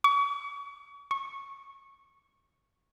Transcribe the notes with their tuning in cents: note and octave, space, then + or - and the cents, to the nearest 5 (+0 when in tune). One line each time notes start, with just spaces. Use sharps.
C#6 +40
C#6 -10